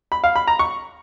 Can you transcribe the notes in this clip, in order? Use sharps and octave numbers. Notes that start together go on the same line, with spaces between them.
B5
F5
B5
A#5
C#6